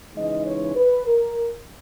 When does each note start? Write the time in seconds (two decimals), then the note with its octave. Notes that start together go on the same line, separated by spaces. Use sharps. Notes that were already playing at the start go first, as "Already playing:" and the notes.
0.15 C#3 E3 G#3 D#4 D#5
0.46 C#5
0.76 B4
1.07 A#4